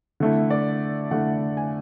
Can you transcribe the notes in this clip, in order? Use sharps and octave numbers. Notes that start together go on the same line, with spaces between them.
D3 A3 E4
D5
D3 A3 E4 F#5
G#5